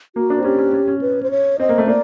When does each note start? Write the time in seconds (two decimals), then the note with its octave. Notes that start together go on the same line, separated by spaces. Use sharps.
0.16 A#3 F#4
0.30 D4
0.38 C4
0.44 C#4 G4
0.58 C#4
0.73 C#4
0.88 C#4
1.01 B4
1.23 C5
1.31 C#5
1.60 C4 D#5
1.69 A#3
1.78 A3
1.87 A#3 D5